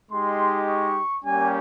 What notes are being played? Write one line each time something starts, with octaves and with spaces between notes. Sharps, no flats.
G#3 D#4 G4 C6
C#6
G3 A#3 C#4 G4 G#5